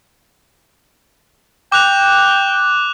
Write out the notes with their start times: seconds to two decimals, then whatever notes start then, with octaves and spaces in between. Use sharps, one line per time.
1.72 G5 D6 F#6 F7